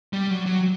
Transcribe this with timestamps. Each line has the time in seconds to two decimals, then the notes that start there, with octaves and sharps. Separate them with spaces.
0.13 G3
0.30 F#3
0.46 F#3